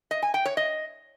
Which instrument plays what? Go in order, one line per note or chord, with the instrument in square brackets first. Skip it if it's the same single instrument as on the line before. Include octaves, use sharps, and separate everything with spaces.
[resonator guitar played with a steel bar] D#5
G#5
G5
C#5
D#5